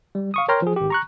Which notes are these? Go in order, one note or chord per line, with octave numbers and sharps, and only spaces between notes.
G3
F5 C#6 D#6
A#4 C#5 G5 A#5 C6 F6
F3 G#4
G#1 G4
A#5 C#6 F#6